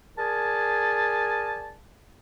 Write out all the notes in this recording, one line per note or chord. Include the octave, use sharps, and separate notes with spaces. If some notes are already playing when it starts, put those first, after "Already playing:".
G#4 A#4 D5 G#5 A5